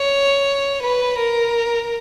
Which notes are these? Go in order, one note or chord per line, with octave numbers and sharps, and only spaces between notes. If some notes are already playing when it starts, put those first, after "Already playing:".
Already playing: C#5
B4
A#4